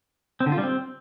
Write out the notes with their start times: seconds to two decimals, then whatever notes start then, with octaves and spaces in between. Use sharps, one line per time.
0.40 C4
0.46 D3
0.52 F4
0.58 G3
0.64 C4